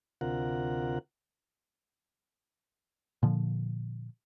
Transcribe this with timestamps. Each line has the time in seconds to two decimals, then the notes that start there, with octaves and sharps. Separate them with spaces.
0.21 D2 C3 F4 A#4 F#5
3.23 A#2 D3 F3